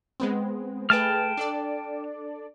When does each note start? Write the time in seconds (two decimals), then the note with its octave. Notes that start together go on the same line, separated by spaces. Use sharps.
0.20 G#3 B3 C4
0.90 A3 G#4 B4 G5 A5 F6
1.37 D4 A4 D5